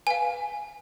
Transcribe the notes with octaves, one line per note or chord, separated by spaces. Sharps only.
B4 F5 G#5